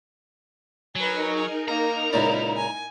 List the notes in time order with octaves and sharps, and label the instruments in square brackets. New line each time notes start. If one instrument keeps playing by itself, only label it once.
[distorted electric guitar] F#3 [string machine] D#4 A#4 [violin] B4 G#5
[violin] G#4
[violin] A#3 [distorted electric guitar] A#5
[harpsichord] C#2 A#2 D5 [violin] E4
[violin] G#5